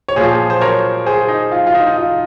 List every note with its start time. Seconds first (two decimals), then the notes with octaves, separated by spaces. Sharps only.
0.09 C#5
0.16 A#2 F3 G#4 C5
0.50 C5
0.61 A#4 C#5
1.06 G#4 C5
1.29 D#4
1.52 F4
1.67 F4
1.75 D#4
1.86 D#4
1.97 F4